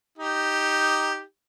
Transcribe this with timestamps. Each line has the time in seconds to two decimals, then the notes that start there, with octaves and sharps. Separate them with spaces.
0.18 D#4 G4